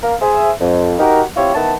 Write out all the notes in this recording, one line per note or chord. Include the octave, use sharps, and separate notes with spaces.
A#3 A#4 F5
G#4 C5 E5
F2
D#4 F#4 G4 A#4
C4 E4 F4 G4 C5 C#5
D#3 B3 E4 A5